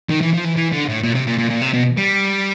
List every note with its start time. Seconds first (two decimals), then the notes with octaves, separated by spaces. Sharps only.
0.09 D#3
0.22 E3
0.34 F3
0.45 E3
0.56 E3
0.72 D3
0.88 A2
1.03 A#2
1.15 C3
1.27 A#2
1.38 A#2
1.50 A#2
1.61 C3
1.73 B2
1.97 G3